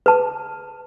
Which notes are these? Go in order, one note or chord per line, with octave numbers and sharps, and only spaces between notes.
B4 A5